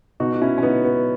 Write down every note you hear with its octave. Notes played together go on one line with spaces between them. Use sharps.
B2 D#4 F#4
F#4
C#4 E4
C#4
B3 D#4
B3